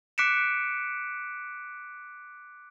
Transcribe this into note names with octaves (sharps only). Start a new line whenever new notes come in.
D6 F#6 B6 C#7 D7 E7